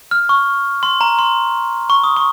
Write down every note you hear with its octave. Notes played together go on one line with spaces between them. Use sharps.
F6
C#6
C6
A#5
C6
C#6
D#6
C#6